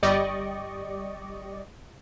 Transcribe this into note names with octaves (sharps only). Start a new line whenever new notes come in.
G1 G3 G4 D5 D#5 C#6